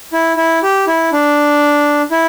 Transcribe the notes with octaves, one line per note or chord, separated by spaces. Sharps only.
E4
E4
G4
E4
D4
E4